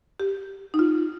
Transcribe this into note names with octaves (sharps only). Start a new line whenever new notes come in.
G4
D#4
F4